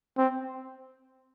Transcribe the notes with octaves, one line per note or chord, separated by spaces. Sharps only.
C4